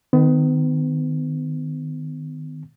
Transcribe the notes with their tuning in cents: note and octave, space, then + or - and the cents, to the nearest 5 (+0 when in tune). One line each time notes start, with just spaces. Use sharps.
D#3 -15 B3 +35